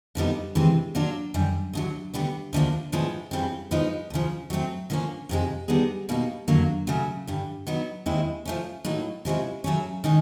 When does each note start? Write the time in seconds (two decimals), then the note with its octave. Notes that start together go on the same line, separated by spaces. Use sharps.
0.15 F2 D3 G3 B3 D#4
0.55 D2 C3 E3 G#3 C4
0.95 F#3 A#3 D4 F4
1.34 F#2 D3 G3
1.73 D2 D3 F#3
2.14 D2 D3 G3 B3
2.53 D2 D3 F3 A#3 D4
2.92 A2 F3 G#3 B3 D4
3.31 F2 C#3 E3 G3 C4
3.71 F3 G#3 B3 D#4
4.10 D2 C#3 F3
4.50 F#3 A3 C4
4.90 D3 F3 A#3 C#4
5.29 F2 C3 D#3 G#3
5.68 D3 G3 B3 D#4 G#4
6.09 B2 G3 A#3 D#4
6.48 F2 D3 F#3 A#3
6.87 C#3 F#3 A3
7.27 G2 D3 G3
7.67 F#3 B3 D#4
8.06 D#2 D#3 G#3 C4 E4
8.45 F3 A3 C#4
8.85 A2 F#3 A#3 D#4
9.25 C3 F3 G#3 C#4 E4
9.64 C#3 F#3 A3 C#4
10.04 D#3 G#3 C#4